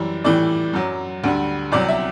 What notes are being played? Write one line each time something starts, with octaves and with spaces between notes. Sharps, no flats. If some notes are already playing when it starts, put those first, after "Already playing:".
Already playing: F#2 E3 G3
A2 E3 G3 D5
F#2 F#3
D2 D3 G3
C2 C3 F#3 D5
E5